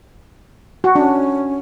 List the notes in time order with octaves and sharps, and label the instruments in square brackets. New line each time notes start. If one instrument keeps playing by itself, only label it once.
[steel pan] F#4
[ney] C#4 [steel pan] D4